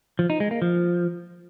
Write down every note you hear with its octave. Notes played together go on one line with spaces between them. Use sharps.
F3
D#4
G#3
A#3
F3